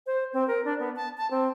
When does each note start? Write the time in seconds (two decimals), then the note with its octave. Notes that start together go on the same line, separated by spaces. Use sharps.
0.06 C5
0.33 C4
0.48 A#4
0.65 D4
0.79 B3
0.96 A5
1.17 A5
1.31 C4